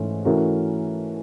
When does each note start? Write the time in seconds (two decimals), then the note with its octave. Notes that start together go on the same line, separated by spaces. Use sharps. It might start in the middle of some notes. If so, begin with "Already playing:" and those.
Already playing: G#2 E3 A3 C#4 E4
0.25 E3 A3 C#4 F#4 A#4